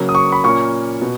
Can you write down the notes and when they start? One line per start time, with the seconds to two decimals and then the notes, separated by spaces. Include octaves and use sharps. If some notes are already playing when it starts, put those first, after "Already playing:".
Already playing: C#3 F#3 A#3
0.09 D#6
0.15 C#6
0.32 B5
0.44 A#2 A#3 C#4 C#6
1.02 B2